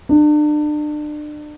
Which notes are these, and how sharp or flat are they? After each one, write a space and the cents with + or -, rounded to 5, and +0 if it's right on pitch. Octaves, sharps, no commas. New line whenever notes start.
D4 +35